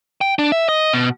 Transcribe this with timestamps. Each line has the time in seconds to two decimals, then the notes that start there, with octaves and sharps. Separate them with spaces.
0.21 G5
0.39 D4
0.52 E5
0.69 D#5
0.93 B2